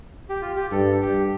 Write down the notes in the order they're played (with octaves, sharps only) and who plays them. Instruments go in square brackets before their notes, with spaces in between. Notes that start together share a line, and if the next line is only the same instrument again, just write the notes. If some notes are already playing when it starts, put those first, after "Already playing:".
[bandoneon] G4
F4
G4
[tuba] G2 [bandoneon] A4
[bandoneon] G4